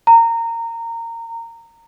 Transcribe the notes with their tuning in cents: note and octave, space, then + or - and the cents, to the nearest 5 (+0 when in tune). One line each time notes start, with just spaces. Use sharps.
A#5 -20